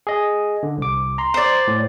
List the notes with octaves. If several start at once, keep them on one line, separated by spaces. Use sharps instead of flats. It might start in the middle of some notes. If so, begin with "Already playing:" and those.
G#4 D#5
D3
C2 D6
A#5 C6
C5 D5
A2